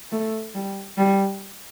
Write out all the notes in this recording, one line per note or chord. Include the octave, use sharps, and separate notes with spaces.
A3
G3
G3